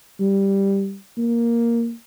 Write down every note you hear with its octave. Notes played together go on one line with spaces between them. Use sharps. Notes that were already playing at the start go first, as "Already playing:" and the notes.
G3
A#3